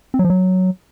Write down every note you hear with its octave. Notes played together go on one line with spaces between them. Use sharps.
C4
F#3
F3
F#3